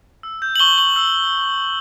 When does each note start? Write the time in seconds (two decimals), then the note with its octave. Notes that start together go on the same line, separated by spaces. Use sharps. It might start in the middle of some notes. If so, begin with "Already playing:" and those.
0.23 E6
0.42 G6
0.56 F#7
0.60 C#6 G7
0.78 C#6 F#7
0.96 E6